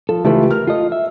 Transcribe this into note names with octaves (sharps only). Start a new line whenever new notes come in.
F3 A4
C#2 E3 A3 F4 G4 B4
A#4 F6
F4 A4 D#5
E5